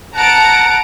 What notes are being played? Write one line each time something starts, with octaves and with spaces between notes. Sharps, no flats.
F#5 A5 A#5 D7